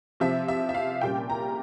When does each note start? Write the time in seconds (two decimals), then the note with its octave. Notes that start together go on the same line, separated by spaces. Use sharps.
0.20 C3 F3 C4 E5
0.48 E5
0.69 E5
0.75 F5
1.01 A#2 G3 A#3 C#4 G5
1.30 A#5